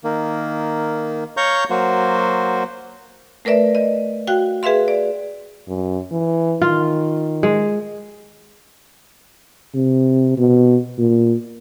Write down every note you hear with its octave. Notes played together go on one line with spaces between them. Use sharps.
D#3 A#3
C#5 F5 A#5 C#6 G6
F#3 A#3 F#4 C5
A3 A#4 B4 D5 E5
D#5
F#4 F5 G5 F#6
G#4 B4 E5 F5 C6
D5
F#2
E3
D#3 F4
G#3
C3
B2
A#2